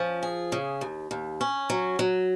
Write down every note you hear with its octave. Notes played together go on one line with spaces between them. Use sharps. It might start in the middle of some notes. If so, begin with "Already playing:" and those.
Already playing: F3 C#4
G#4
C#3
D#2
D#2
C#4
F#3
F#3